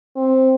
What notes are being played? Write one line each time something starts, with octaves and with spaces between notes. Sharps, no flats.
C4